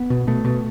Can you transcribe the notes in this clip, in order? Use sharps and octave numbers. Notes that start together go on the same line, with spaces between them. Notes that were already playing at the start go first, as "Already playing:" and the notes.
Already playing: B3
B2
B2 A3
B2